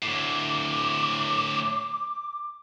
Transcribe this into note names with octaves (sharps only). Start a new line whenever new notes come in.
D2 A2 D6